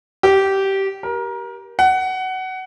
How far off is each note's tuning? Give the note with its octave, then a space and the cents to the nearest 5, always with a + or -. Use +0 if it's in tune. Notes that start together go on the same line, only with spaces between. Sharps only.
G4 -15
A#4 +25
F#5 +20